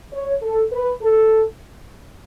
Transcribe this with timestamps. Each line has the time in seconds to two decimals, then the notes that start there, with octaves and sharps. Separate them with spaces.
0.13 C#5
0.43 A4
0.72 B4
1.02 A4